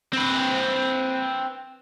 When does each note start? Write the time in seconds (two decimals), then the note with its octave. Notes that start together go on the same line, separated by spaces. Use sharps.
0.13 C4 B4